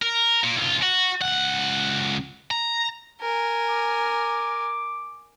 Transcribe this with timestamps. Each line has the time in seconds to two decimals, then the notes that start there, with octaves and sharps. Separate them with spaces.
0.02 A#4
0.44 A#2 A#3
0.57 B1 F4
0.82 F#4
1.21 C#2 F#5
2.51 A#5
3.21 A#4 G#5
3.68 D6